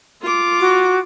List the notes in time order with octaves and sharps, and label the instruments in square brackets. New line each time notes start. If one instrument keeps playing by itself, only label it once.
[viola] F4 D6
[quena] F#4